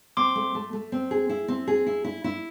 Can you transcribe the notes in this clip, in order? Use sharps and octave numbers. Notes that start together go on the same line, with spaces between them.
C4 C6 D6
A3
A3
A3
C4
G#4
E4
C4
G#4
E4
E4
E4